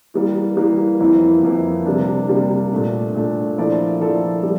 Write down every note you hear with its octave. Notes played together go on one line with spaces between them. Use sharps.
E3 G3 A#3
E3 G3 A#3
F2 E3 A#3 E4
F2 E3 A#3 E4
C3 G3 A#3 D4
C3 G3 A#3 D4
A#2 A3 D4
A#2 A3 D4
F3 A#3 E4 A4 D5
F3 A#3 E4 A4 D5
G3